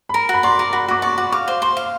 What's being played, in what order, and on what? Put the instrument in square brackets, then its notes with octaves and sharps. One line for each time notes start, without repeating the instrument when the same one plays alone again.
[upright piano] B5
[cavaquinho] A#4 [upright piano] A#5
[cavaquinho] F#4 [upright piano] B5
[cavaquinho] D5 [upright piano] C6
[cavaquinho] A#4
[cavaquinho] F#4 [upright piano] B5
[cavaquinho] F#4 [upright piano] D6
[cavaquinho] D5 [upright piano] C#6
[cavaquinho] F#4
[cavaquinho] F5 [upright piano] D6
[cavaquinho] C5
[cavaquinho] C5 [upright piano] C6
[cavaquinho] F5